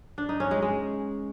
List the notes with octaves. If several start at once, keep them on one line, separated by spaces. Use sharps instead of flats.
D4
D#4
C#4
G#3
G#3